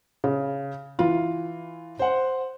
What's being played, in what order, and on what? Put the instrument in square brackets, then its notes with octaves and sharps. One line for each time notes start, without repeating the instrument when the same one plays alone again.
[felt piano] C#3
E3 F4
[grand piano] C5 F#5